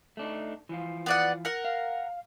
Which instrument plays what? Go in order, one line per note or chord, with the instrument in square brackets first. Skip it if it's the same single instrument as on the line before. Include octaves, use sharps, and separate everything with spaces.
[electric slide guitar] A3 D4 D#4
E3 F3 F4
[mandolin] B3 D5 F#5
A#4 F#5
[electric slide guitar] F5